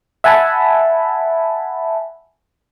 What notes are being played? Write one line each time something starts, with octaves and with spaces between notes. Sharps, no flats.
E5 F#5 G#5 A5 B5